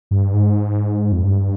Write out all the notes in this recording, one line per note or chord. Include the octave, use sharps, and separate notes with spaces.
G2
G#2
F2
G2